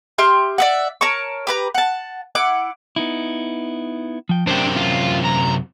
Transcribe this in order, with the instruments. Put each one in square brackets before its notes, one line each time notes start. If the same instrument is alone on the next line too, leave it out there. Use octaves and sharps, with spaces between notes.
[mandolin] G4 E5 C6 F6
D5 E5 F#5
A#4 C#5 A5 C#6
G4 B4 A#5
F#5 A5
E4 F#5 D6
[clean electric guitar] B3 D#4 E4
F3 G5
[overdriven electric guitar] F#2 C3 [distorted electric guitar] D4 [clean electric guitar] C5 G5
[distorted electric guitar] F4
A#5